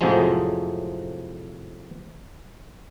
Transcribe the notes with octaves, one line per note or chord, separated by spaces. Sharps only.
F2 A2 C3 F3 F#3 G#3